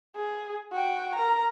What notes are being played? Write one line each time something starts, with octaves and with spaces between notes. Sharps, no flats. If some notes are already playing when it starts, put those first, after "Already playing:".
G#4
F#4 G5
A#4 A#5